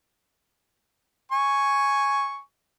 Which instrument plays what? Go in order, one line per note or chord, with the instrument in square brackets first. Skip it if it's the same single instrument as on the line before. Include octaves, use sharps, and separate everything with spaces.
[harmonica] G#5 C#6